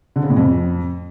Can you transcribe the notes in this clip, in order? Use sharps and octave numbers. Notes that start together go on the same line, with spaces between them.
D3
C#3
A2
F2